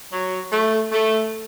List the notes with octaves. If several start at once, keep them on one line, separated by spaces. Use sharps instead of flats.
F#3
A3
A3